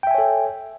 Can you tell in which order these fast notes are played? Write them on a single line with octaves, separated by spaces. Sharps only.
G5 E5 G#5 C#5 A4